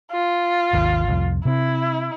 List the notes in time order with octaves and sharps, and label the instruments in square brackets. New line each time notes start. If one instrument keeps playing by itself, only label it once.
[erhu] F4
[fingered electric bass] G#1 D#2
C2 F2
[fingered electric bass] C3 C4 [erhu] E4